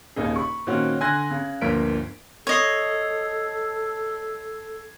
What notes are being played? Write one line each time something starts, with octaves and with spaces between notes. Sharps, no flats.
D#1 D#2 C#3 D#4 G#4
B5 C#6
A#2 D#3 C4 C#4 F#4
D3 G#5 C6 F#6 G#6 A#6
C#3
G1 D2 F3 A#3 B6 D7
A4 C#5 D#5 G#6 C7